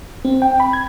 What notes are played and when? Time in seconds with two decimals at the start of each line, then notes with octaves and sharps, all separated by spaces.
0.25 C4
0.42 G5
0.60 B5
0.73 G#6